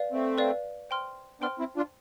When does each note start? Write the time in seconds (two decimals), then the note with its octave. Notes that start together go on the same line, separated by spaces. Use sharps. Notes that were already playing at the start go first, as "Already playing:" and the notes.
Already playing: B4 D5 F5
0.12 A3 C4
0.38 B4 D5 F5
0.90 C5 G5 C6 F6
1.41 B3 D4 C5 G5 C6 F6
1.59 C4 E4
1.76 D4 F4